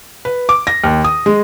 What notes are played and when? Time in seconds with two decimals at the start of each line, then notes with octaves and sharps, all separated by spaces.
0.25 B4
0.49 D6
0.67 A#6
0.84 D#2
1.04 D#6
1.26 G#3